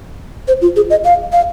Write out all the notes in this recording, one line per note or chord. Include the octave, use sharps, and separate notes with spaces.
C5
F4
G#4
D#5
F5
F5